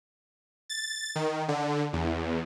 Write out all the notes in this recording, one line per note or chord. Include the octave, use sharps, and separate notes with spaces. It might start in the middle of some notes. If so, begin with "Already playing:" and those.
A6
D#3
D3
E2